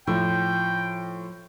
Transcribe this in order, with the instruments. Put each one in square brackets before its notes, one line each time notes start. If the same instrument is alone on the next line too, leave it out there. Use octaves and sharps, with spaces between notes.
[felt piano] A2 [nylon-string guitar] F3 [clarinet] G5